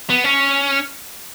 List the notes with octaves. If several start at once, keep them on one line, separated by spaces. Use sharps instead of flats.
B3
C#4